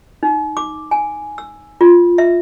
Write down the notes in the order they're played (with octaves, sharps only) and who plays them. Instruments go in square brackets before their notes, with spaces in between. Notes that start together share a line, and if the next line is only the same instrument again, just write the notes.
[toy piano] D#4
D6
G#5
E6
F4
E5